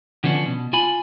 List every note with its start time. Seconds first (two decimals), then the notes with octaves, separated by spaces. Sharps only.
0.24 D3 F3 B3 C#4 D4
0.45 B2
0.73 F4 G#5 B5